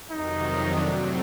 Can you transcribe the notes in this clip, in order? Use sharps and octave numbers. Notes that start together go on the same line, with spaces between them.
F2 C3 D#3 F#3 D#4
A2 F#3 A3 C4 D4